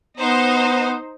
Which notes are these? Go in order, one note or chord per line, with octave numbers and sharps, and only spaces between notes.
B3 D#4 C5